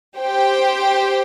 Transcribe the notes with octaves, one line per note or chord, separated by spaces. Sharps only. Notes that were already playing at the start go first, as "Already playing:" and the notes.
G4 C5 G5